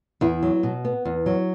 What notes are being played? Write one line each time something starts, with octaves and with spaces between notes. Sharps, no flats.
E2 E4
F#3
B2
B3
E2
F#3